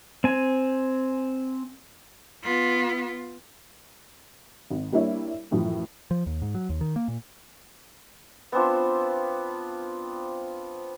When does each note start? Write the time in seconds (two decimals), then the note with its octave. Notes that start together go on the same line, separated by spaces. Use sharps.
0.24 C4 G#5
2.44 B3 F4
4.70 G#1
4.92 G3 A#3 D4 E4 C#5 E5
5.51 F#2 A2 E3 F3
6.11 F3
6.26 D#2
6.42 G#2
6.55 F#3
6.69 D#2
6.81 D#3
6.96 A#3
7.08 A#2
8.52 B3 C4 D4 F4